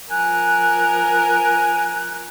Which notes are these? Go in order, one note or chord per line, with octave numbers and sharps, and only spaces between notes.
F3 A#4 G#5 F#6